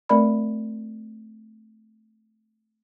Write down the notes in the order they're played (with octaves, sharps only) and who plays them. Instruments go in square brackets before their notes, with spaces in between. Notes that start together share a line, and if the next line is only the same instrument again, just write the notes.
[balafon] A3 C4 A#4 D5 B5